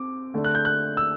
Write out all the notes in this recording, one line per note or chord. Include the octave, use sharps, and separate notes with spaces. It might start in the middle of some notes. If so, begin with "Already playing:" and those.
Already playing: C4 D6
D3 A3 D4
F#6
G6
F#6
E6